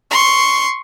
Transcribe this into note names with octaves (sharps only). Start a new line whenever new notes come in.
C6 C#6